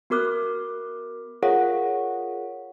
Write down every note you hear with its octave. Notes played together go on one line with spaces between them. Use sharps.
B3 F#4 A#4 D6 F6 F#6
F4 G#4 A#4 C#5 F5 F#5